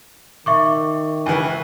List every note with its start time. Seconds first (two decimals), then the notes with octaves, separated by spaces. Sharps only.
0.46 D#3 E5 C#6 D6
1.26 C#2 E3